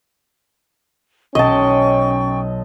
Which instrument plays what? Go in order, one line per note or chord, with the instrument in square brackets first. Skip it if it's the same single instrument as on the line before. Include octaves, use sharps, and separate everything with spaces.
[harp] B1 [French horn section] C#4 [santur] D#5 A5 [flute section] G5 C#6